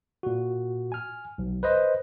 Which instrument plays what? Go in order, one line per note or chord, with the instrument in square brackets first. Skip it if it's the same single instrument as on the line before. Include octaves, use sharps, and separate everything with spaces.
[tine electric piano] A#2 F#4
G#5 F6
B1
B4 C5 D#5